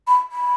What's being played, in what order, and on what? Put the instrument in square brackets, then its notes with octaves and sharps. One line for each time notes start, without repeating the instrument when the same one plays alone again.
[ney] B5
B5